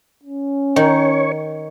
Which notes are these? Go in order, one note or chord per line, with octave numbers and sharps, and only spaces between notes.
C#4
D#3 C#5